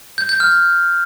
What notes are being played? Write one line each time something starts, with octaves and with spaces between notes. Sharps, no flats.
G6
G6
F6
G6